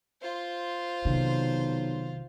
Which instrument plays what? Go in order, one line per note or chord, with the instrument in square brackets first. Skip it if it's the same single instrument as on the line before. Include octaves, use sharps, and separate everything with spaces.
[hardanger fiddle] F4 C5
[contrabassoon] B1 [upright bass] C3 D#3